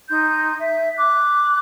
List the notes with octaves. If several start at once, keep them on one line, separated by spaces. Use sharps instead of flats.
D#4 C6 G6
E5
D6 F#6